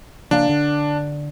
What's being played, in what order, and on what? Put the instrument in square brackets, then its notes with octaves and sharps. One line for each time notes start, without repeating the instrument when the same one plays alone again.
[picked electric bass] C#3 F3 A#3 [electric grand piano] D4
[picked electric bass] D3